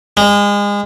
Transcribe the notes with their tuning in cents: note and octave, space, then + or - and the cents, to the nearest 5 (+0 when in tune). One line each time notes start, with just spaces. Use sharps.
G#3 -30